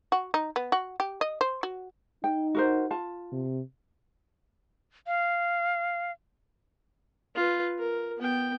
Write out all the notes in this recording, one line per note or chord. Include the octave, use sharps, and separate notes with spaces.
F#4
D#4
B3
F#4
G4
D#5
C5
F#4
D#4 G5
F#4 A#4 C5
F4 A5
C3
F5
F4 B4
A#4
B3 G5